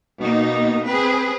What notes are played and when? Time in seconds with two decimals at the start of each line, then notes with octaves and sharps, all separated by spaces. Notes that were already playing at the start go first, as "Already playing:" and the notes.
0.20 B2 A#3 D#4
0.89 C4 G#4 B4